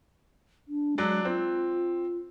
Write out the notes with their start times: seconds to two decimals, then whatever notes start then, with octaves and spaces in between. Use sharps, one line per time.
0.68 D4
0.98 F#3 G#3 D4
1.25 C4 F4